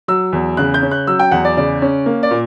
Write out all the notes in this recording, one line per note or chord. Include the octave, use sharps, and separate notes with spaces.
F#3 E6
E2
C#3 F#6
G6
C#4
F#6
F#3 E6
G5
E2 F#5
D5
C#3 D5
C#4
A#3
D5
A#2